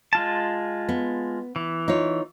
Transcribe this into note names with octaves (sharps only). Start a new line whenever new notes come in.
G#3 F4 A5
B3
E3
D#4 F4 C#5